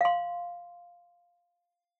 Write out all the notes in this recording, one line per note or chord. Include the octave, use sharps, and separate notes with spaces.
F5 C6